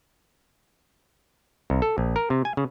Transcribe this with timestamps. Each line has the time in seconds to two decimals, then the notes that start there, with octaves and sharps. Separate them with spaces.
1.70 C2
1.82 A4
1.98 A#1
2.16 A#4
2.30 C3
2.45 G#5
2.57 C#3